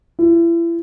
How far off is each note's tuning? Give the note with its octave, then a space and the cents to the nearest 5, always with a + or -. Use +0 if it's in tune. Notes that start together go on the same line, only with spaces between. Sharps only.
E4 +35